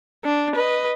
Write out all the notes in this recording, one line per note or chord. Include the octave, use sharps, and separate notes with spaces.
D4
B4 D#5